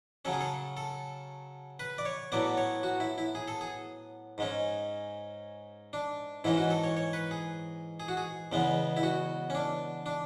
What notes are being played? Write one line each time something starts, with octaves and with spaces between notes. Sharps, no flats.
C#3 F#3 C#4 A4
G#4
A4
A4
B4
D5
C#5
A2 F#3 B3 D5
C#5
F#4
E4
E4
G#4
A4
G#4
G#2 G#3 C#4
D4
G#2 E3 G#3 C#4 E4
F#4
A4
C#5
C#5
B4
G#4
G#4
F#4
G#4
E2 C#3 G#3 B3
E4
F#4
C#4
D4
D4